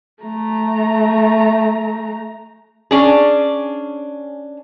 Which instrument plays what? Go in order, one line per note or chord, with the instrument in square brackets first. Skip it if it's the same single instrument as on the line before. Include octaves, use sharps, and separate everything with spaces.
[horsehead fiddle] A3 A#5
[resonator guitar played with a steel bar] C#4 D4 G#4